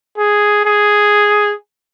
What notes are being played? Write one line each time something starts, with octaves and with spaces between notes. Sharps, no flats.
G#4
G#4